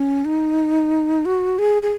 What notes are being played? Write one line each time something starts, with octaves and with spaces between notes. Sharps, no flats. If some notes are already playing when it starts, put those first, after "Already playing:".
Already playing: C#4
D#4
F#4
G#4
G#4